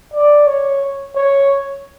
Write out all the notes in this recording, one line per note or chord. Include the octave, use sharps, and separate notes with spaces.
D5
C#5
C#5